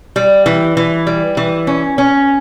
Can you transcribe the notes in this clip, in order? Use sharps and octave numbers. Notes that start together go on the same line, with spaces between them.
G3
E3
E3
G3
E3
C#4
C#4